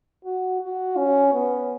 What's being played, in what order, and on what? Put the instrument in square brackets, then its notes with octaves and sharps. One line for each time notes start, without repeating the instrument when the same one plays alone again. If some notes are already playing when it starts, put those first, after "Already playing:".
[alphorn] F#4
F#4
C#4
B3